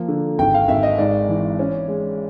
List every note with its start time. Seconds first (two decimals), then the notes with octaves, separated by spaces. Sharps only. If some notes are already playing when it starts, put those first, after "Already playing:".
Already playing: F3 A#3
0.08 D3
0.38 G#1 G5
0.54 F5
0.68 G#1 E5
0.83 D#5
0.98 G#2 D5
1.29 E3
1.59 C#4
1.88 G#3